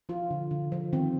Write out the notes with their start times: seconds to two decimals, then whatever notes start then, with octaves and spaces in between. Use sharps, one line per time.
0.09 F3 F4
0.31 D3
0.51 D3
0.72 F3
0.93 D#3 C4